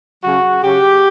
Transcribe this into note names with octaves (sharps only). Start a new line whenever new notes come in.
C#3 F#3 F#4
C#3 F#3 G4